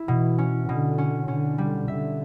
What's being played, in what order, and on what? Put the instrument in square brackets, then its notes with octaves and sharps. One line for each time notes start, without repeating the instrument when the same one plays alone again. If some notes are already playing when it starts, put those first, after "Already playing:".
Already playing: [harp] E4
[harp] B2 [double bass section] E3
[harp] C#4
[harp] B2 [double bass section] D3
[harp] C#4
[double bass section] D3 [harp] C#4
[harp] G3
[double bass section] D3 [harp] E5